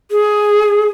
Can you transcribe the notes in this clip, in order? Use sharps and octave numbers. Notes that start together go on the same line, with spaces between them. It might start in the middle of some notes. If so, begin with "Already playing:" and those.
G#4